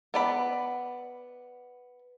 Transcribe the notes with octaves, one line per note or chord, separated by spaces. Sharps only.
B3 D5 B5